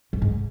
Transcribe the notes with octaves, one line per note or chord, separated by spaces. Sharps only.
F#2
G#2